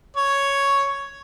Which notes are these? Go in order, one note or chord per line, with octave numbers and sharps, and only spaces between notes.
C#5